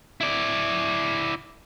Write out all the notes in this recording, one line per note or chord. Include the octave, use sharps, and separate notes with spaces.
E4 D5